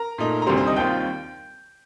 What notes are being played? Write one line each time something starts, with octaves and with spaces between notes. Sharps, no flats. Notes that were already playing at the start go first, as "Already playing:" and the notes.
Already playing: A#4 A#5
A#2 A3 D#4
A#5
D2 C3 D#3 G3 C5 C6
C5 C6
D#5 D#6
D#2 D#3 G3 C4 F4 G5 G6